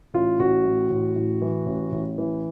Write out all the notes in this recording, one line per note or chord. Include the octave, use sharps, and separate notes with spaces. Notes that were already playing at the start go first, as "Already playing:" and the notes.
A1 F4
A1 F#4
A2
A1
A2
E3
A1
A1
E3